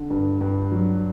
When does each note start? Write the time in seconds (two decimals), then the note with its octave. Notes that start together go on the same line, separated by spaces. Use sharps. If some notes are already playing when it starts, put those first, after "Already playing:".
Already playing: D3
0.10 G2
0.41 G2
0.72 F#3